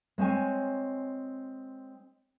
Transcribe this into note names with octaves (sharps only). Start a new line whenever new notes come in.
G#3 C4 C#5 G#5